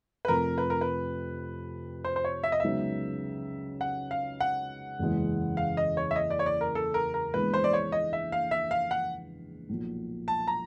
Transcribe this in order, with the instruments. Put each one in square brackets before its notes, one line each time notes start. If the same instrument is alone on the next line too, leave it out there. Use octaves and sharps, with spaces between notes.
[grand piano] B4
[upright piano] F2 C3 F3 A3 [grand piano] A#4
[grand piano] B4
A#4
B4
C5
C5
C#5
E5
D#5
[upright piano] C#2 C#3 F#3 B3 D#4 [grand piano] E5
[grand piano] F#5
F5
F#5
[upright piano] F#1 E2 C#3 E3 G#3
[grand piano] F5
D#5
C#5
E5
D#5
D5
C#5
D5
A#4
A4
A#4
A#4
[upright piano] A#1 G#2 E3 G#3 B3 [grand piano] B4
[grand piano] C5
D5
C#5
D#5
E5
F5
E5
F5
F#5
[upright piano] B1 A#2 F3
[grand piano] A5
A#5